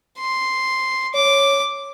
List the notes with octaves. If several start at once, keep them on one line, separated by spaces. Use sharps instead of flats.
C6
C#5 D6